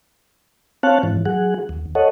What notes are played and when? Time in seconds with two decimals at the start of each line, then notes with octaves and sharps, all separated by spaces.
0.83 C4 C#5 F5 A5 F#6
1.03 G#2 E3
1.26 F#3 G#4 F#5
1.69 D#2
1.95 A4 C#5 D#5 F#5